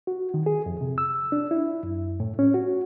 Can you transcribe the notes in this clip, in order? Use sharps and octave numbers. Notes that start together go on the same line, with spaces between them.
F#4
D#3
G#4
F2
C3
E6
D4
E4
F#2
A2
C#4
F#4